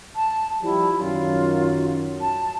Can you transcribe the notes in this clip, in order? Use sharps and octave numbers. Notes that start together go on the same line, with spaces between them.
A5
F3 G3 E4
F#2 D#3 F#3 F4
A5